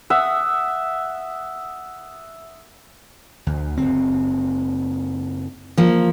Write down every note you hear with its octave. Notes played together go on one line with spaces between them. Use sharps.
E5 F#5 D#6
D2
F#1 C4
F3 A#3